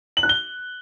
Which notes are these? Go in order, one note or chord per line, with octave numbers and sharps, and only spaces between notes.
F#7
F#6
G7